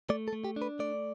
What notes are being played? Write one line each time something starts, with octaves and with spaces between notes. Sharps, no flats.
A3 D5
A4
A3
G4
D4
B4
A3 D5